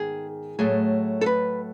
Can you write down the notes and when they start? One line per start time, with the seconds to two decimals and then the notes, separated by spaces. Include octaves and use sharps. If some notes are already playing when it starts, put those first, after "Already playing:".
Already playing: G#2 D#3 B3 G#4
0.59 A2 F#3 A3 G#4
1.21 A4
1.26 B4